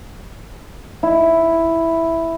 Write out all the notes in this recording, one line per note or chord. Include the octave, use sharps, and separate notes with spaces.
E4